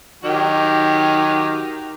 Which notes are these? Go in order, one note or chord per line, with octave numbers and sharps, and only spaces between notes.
D#3 F#3 G4